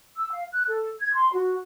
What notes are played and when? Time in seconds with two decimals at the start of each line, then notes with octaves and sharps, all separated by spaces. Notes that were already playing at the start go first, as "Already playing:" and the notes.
0.17 E6
0.32 F5
0.53 F#6
0.68 A4
1.00 G#6
1.14 C6
1.34 F#4